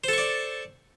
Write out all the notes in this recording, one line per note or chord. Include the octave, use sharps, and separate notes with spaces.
A4 C5 D5 C#6